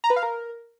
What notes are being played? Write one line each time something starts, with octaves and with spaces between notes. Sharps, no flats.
A#5
B4
F5
A#4